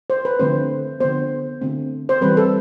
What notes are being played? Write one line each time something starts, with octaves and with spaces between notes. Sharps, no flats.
C5
B4
D3 F3 A3 C4 C5
D3 F3 B3 C5
D3 A3 C4
C5
E3 G3 C4 B4
A4